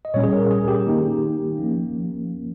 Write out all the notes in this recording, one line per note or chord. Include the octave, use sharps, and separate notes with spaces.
D#5
A#2 G3 C#4 C#5
G#4
A#4
G#4
G4
D#3 A#3 D#4
F3 A#3 C#4